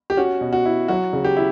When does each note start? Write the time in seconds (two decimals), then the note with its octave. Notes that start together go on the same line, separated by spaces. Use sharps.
0.10 G4
0.17 C#4 F#4
0.41 B2
0.53 F#4
0.65 E4
0.88 F#3 F#4
1.13 C#3
1.24 G4
1.37 E4